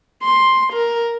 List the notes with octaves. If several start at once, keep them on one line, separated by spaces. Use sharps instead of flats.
C6
A#4